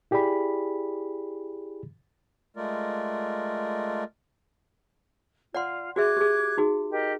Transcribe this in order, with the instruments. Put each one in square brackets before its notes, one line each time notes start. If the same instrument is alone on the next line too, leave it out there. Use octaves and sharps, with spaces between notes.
[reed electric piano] E4 G4 G#4 D5 B5
[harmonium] G#3 A3 F4 A#4 D5
[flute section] F4 [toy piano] D5 F#5 C6
[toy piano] F#4 G#4 E5 [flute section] D6 F#6 G#6
[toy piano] G4 G#4
D#4 F#4 G#4
[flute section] G4 A#4 D#5